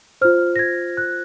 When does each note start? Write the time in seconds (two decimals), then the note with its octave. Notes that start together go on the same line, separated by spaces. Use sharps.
0.21 F4 C5 F6
0.56 A#6
0.59 G#6
0.97 F#6